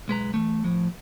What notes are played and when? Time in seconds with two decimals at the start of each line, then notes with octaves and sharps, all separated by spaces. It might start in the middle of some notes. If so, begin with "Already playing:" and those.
0.08 B1 G#3 B4 A#5
0.34 E3 F3 A3
0.64 A2 F3